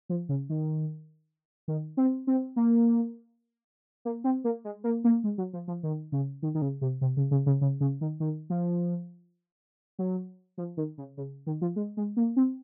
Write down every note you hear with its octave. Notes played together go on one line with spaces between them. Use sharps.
F3
C#3
D#3
D#3
C4
C4
A#3
A#3
C4
A#3
G#3
A#3
A#3
G#3
F#3
F3
F3
D#3
C#3
D#3
D#3
C#3
C3
C3
C#3
C#3
C#3
C#3
C#3
D#3
D#3
F3
F#3
F3
D#3
C#3
C#3
D#3
F3
G#3
G#3
A#3
C4